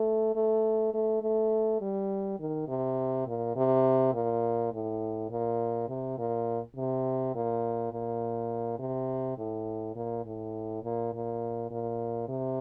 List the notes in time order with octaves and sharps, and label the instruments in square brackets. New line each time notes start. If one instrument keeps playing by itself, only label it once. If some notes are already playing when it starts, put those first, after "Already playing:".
Already playing: [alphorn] A3
A3
A3
A3
G3
D#3
C3
A#2
C3
A#2
A2
A#2
C3
A#2
C3
A#2
A#2
C3
A2
A#2
A2
A#2
A#2
A#2
C3